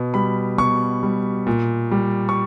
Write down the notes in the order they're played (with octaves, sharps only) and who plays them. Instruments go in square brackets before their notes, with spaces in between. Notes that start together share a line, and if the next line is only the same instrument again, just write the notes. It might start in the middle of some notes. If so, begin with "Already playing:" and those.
Already playing: [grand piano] B2
G3 B5
B2 C#6
G3
A#2
G3
C#6